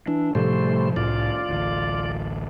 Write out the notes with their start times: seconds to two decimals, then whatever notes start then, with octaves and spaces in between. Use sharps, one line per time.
0.08 E3 D4
0.35 A2 C3 F3 G3 A3 C5
0.96 C2 A2 F4 D5
1.49 A1 D2